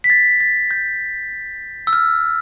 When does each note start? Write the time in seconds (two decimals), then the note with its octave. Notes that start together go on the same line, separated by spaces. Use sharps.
0.04 B6
0.10 A6
0.40 A6
0.71 G6
1.87 E6
1.93 F6